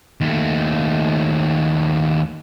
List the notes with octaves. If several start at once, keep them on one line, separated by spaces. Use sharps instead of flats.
D#2 A3